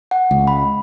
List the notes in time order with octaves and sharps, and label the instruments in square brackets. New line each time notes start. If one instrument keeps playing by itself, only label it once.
[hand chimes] F#5
[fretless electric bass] C#2
[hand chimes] B5